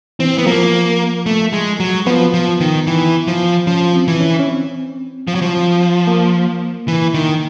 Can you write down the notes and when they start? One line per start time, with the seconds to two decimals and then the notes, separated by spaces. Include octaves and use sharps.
0.19 E3 C4
0.38 B3
0.47 F3 A#3
1.26 A3
1.53 G#3
1.80 F#3
2.06 F3 B3
2.34 F3
2.60 D#3
2.87 E3
3.28 F3
3.67 F3 C#4
3.94 C4
4.08 E3
4.20 C#4
4.40 C#4
4.47 C4
5.28 F3
5.35 F#3
5.42 F3
6.07 A#3
6.88 E3
7.14 D#3